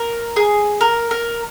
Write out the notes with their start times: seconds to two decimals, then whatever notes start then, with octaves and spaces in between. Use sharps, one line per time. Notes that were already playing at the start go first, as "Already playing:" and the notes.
Already playing: A#4
0.36 G#4
0.81 A#4
1.11 A#4